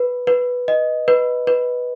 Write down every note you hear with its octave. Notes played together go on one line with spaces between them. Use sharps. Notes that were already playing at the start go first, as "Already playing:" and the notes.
Already playing: B4
B4
D#5
B4
B4